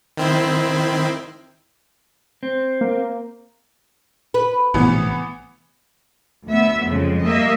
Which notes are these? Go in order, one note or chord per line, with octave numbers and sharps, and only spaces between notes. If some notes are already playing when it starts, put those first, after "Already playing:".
D#3 C4 E4
C4
A#3
B4
A#1 A2 C3 E3 B3
D2 B3 E5
F2 C#3 F3 G#3
G3 A#3 D#5 E5